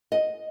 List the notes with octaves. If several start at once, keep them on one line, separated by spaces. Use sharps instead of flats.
D#5